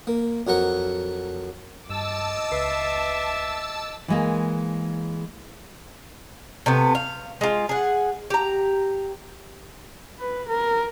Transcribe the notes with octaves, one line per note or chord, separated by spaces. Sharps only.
A#3
F2 F#3 A#4 F#5
G2 D#5 A5 D6 E6
C#2 B4 E5 C7
E3 G#3 A#3
C3 A3 B3
F5
G#3 F4
G#4 F#5
G4 A#5
B4
A#4